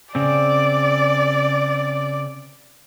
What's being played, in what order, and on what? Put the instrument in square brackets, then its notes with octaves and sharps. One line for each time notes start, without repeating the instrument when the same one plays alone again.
[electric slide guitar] C#3 C4 [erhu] D5